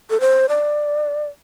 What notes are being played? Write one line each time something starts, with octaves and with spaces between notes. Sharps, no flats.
A4
C5
D5